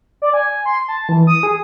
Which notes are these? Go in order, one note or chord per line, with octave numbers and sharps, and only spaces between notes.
D5
G#5
C6
A5
E3
D#6
G#4